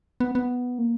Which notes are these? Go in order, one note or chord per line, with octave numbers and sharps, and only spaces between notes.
B3
B3
A#3